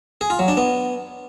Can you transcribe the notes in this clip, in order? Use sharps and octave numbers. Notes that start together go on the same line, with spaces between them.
G#4
F4
F#3
D4
B3